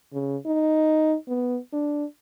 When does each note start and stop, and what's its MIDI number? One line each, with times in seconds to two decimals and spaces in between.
0.13 0.37 49
0.46 1.16 63
1.28 1.58 59
1.73 2.05 62